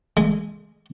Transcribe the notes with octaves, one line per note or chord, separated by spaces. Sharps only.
G#3